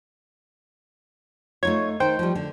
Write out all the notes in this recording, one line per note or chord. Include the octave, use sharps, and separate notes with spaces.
A3 D#4 F4 C#5 G#6
D#3 D#4 C5 G5
F3 G3
D3